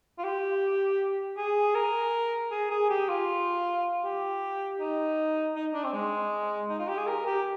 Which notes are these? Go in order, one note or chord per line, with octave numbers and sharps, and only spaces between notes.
F4
G4
G#4
A#4
G#4
G#4
G4
F4
G4
D#4
D#4
D4
C4
G#3
D#4
F4
G4
G#4
A#4
G4